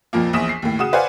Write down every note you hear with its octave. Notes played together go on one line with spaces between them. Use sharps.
F2 A#2 F3 A#3
A#1 E2 D#6 B6 E7
C7
D#2 A2
C#3 F#4 D#6 E7
B4 C5 D5 F5 F#5 G#5